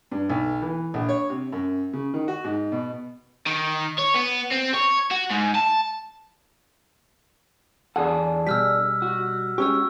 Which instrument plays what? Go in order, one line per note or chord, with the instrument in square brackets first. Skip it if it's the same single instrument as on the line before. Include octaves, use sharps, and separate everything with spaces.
[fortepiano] G2
B1
E3
A#1
C#5
C3
F#2
C#3
D#3
F#4
G#2
B2
[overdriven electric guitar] D#3
C#5
B3
C4
C#5
F#4
G#2
A5
[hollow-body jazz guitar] E2 F#5 [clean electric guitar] D4 G#4 A4
[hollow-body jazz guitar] B2 G3 [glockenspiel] E6 F6 B6
[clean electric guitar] F#4
[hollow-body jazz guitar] G#3 C#4 G4 [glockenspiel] C#6 E6